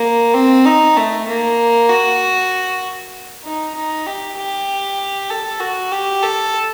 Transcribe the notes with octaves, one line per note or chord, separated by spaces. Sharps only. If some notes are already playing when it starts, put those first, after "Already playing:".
Already playing: A#3
C4
D#4
A3
A#3
F#4
D#4
D#4
G4
G4
A4
F#4
G4
A4